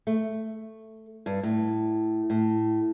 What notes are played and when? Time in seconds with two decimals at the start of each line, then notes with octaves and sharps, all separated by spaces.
0.07 A3
1.26 G2
1.43 A2
2.30 A2